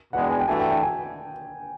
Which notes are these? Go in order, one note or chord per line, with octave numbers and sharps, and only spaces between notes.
E2 B2 G#3 B3 D4 F#5
G5
G#5
G5
G2 E3 A3 D4 F#4 G#5
G5
G5
G#5